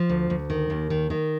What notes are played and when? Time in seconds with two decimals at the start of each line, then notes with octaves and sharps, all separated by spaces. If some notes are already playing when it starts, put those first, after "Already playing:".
Already playing: F3
0.09 D2
0.30 D2
0.50 D#3
0.70 D#2
0.90 D#3
1.10 D#3